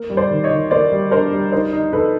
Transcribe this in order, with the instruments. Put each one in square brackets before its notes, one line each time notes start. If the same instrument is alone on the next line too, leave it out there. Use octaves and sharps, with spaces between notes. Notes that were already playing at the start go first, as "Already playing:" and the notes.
Already playing: [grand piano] A#3
G3
[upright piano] C5 D5
[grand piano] D#3
[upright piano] C#5 D#5
[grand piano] D#3
[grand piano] A#3 [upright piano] C5 D5
[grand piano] G3
[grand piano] D4 [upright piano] A#4 C5
[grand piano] G3
[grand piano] D#4 [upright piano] A#4 C5
[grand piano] D#4
[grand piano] D#4 [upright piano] A4 B4